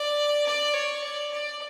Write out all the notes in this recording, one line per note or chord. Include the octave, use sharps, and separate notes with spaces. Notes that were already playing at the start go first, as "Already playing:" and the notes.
Already playing: D5
D5
C#5
D5
D5